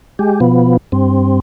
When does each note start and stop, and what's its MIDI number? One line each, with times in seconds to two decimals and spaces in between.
0.19 0.40 56
0.19 0.40 67
0.40 0.77 47
0.40 0.77 53
0.40 0.77 59
0.92 1.40 43
0.92 1.40 60